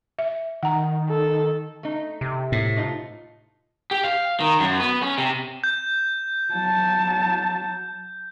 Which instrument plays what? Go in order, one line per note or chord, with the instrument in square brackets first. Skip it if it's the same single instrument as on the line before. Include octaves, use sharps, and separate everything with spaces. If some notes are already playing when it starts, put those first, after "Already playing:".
[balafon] E5
[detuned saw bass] D#3 [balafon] F#5 A#5
[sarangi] A4
[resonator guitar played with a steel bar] A3 D#4
[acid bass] C3
[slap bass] A2
[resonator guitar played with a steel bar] A3 D#4 F4
[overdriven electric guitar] G4
F5
D#3
F#2
B3
C#4
C3
[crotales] G6
[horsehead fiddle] F#3 A5